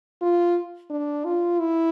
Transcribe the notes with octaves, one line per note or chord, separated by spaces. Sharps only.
F4
D4
F4
E4